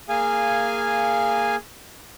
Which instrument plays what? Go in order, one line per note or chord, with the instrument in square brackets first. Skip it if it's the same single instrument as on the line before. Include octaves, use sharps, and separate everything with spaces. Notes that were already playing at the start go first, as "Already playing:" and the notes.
[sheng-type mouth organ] A#3 G#4 F5 G#5